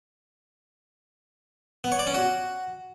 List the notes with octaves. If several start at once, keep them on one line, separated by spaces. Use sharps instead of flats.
B3
C#5
D5
C#4
F#4